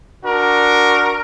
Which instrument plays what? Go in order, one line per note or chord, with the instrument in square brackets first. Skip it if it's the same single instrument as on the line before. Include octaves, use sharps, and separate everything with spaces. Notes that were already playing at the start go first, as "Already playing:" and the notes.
[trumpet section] D4 F#4 A#4